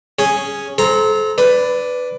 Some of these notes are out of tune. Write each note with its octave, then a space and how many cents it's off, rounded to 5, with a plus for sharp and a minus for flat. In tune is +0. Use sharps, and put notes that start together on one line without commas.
C#4 +0 G#4 +0
A4 -30 C5 +0 A#5 -10
D4 -5 B4 +15